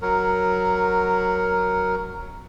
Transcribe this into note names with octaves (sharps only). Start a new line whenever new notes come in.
F#3 A#4